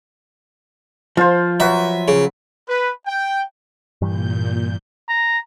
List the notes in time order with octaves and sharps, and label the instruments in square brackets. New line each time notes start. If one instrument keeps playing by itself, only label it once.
[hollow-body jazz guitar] F3 [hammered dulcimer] F4 C5
[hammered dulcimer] F#3 B4 [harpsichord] E5
[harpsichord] C#3
[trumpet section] B4
G5
[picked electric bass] G2 E3 G3 [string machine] A#2 G6
[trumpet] A#5